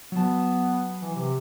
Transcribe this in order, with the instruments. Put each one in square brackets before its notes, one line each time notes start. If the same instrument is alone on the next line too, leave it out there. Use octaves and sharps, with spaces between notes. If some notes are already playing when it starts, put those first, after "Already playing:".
[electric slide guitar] F#3 A5 [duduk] B3
[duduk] E3
C3